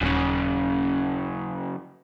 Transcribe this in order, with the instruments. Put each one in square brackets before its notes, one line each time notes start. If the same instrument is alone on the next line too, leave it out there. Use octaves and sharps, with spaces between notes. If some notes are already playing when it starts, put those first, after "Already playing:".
[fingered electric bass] D#1 [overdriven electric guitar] F#2 C#3